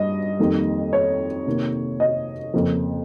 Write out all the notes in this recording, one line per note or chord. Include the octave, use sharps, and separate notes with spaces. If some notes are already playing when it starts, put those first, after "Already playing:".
Already playing: G2 D#5
F2 D#3 G3 A#3
C#5
C3 D#3 A#3
D#5
F2 C#3 F3 A#3